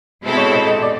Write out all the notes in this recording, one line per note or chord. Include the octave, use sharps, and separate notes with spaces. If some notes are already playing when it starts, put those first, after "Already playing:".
B2 G#3 C4 E4 A4
C#5
D#5
D#5
D5